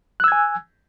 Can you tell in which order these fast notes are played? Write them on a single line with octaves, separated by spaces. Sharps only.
F#6 E6 G#6 G#5